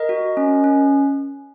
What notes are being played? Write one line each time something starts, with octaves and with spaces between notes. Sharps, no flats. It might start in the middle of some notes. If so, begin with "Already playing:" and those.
Already playing: A#4 D#5
F#4
C#4
C#4